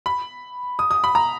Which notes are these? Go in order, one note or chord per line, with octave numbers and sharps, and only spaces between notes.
B5
D#6
D#6
B5
A#5